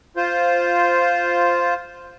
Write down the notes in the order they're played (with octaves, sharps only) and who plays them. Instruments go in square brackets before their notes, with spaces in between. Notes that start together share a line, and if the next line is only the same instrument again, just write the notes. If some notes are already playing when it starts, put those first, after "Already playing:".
[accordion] F4 C5